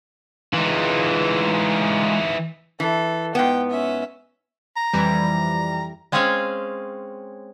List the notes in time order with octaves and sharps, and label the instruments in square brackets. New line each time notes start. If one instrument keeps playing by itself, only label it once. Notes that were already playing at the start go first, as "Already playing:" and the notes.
[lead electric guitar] E3 D#4 [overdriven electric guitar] G#3 F4
[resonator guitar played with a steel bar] E3 [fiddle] A4
[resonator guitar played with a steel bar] G#2 B3 [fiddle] G5
[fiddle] C#4 E5
[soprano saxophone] A#5
[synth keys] F2 E3 G3
[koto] G#3 C4 C#4 G#4 C#5 F5